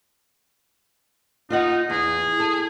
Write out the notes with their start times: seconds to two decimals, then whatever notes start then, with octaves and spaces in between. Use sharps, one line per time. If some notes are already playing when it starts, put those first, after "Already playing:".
1.50 D#4 F4 D#5 F#5
1.90 E2 G#4
2.40 A4